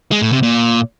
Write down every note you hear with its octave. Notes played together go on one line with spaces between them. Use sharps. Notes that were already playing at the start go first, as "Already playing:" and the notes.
G#3
A2
C3
A#2